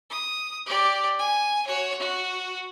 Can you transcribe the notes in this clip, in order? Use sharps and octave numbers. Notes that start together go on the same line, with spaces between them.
D#6
G4 D5
G#5
F#4 C#5
F#4